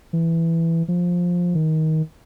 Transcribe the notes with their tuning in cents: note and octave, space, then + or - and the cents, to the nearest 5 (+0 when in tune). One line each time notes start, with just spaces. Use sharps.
E3 +5
F3 +10
D#3 +20